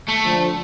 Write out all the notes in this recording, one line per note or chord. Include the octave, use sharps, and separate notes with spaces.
A3
D3 F3